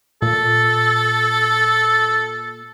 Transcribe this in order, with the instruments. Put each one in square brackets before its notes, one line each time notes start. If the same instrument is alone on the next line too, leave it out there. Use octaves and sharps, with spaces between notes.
[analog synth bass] A#2 [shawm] A4